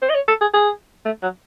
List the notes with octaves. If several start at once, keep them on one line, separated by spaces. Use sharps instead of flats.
C5
D#5
C#5
A4
G#4
G#4
A3
F#3